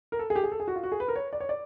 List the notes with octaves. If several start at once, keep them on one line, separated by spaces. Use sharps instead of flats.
A#4
A4
G#4
G4
G#4
A4
G#4
F#4
F4
F#4
G#4
B4
A#4
C#5
D5
C#5
D5